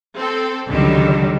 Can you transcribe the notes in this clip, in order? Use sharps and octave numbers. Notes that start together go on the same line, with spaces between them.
C4 A4
C#2 D3 D#3 F#3 G3